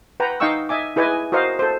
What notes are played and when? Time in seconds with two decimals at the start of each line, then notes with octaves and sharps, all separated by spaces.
0.20 B4 F#5 G5 A#5
0.40 D#4 D#5 F5 G5 C#6 E6
0.69 D#5 E5 G#5 D6
0.96 E4 G#4 B4 D#5 G#5 D6
1.32 F#4 A#4 C5 D#5 F5
1.59 A4 C5